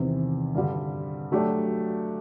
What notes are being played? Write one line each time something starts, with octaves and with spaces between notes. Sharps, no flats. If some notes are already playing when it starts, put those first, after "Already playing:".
Already playing: E2 C3 D#3
G2 D3 G3
F#3 A3 D4 G4